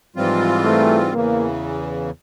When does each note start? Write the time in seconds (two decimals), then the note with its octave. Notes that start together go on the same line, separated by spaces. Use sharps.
0.16 G#2 E3 F3 G3 C4 F4
0.65 A3
1.13 E2 C#3 E3 A#3